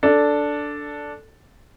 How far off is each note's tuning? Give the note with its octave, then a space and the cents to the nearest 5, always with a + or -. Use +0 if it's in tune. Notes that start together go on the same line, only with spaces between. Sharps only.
D4 -5 A4 +0